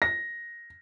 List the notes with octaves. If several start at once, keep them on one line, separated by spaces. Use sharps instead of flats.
A#6